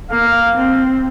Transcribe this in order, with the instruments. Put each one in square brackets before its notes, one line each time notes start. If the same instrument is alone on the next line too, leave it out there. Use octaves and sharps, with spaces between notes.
[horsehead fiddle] A#3 [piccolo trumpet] F5
[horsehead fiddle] C4